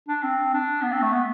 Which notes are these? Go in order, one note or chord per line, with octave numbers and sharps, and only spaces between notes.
D4
C4
D4
B3
C4
A3
B3